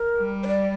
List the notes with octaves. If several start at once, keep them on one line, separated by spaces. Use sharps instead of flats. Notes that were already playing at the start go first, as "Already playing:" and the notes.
Already playing: A#4
G3
C5
D5